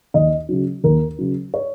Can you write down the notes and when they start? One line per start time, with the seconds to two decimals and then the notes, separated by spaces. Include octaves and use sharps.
0.14 D#2 D#5
0.49 C#3 F#3
0.84 D#2 A#4
1.18 C#3 F#3
1.54 C#5